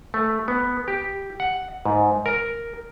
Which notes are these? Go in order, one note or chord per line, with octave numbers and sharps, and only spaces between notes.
A3
B3
G4
F#5
G#2
A#4